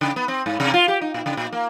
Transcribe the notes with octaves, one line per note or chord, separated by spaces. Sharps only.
C#3
B3
C4
G#2
C3
F4
G4
D#4
A#2
C#3
A#2
A#3